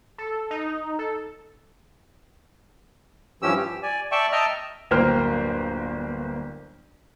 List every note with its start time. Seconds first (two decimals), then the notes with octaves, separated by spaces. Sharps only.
0.18 A4
0.51 D#4
0.99 A4
3.42 G2 E3 F3 C#4 G4 E6
3.57 G4
3.83 D5 G#5
4.12 D5 E5 G5 A5 C#6
4.32 D#5 E5 G5 A5 A#5 F6
4.91 D1 G1 A#3 C5 G5 F6